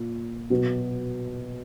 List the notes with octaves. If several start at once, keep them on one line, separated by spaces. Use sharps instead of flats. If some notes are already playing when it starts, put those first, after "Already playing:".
Already playing: A#2
B2 F#3 B3